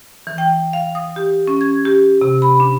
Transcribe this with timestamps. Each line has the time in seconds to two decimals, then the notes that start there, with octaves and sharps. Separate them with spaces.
0.27 E3
0.38 G5
0.73 F5
0.95 D#6
1.16 G4
1.48 C#4
1.61 G#6
1.85 G4
2.21 C3
2.42 B5
2.60 D4